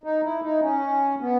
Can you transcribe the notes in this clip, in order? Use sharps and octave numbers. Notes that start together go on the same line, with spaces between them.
D#4
E4
D#4
C#4
B3